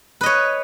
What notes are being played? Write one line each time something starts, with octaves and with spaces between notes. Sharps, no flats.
B4 C#5 D#5